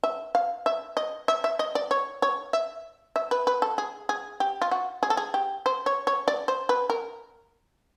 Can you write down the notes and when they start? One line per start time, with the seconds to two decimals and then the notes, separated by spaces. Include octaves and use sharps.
0.04 E5
0.35 F5
0.66 E5
0.97 D#5
1.28 E5
1.44 E5
1.59 D#5
1.75 D5
1.91 C#5
2.22 C#5
2.53 E5
3.16 E5
3.31 B4
3.47 B4
3.62 A4
3.78 G#4
4.09 G#4
4.40 G4
4.62 F4
4.71 F#4
5.03 G#4
5.10 A4
5.17 G#4
5.34 G4
5.66 C5
5.86 C#5
6.07 C#5
6.28 D5
6.48 C5
6.69 B4
6.90 A#4